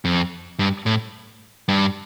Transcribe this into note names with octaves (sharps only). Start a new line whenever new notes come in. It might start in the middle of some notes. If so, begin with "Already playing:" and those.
F2
G2
A2
G2